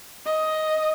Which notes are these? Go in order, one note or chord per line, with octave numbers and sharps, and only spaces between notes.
D#5